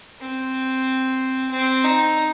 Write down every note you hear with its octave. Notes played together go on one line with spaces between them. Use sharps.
C4
C4
D#4